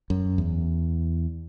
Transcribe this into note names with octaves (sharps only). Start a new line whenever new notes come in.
F#2
E2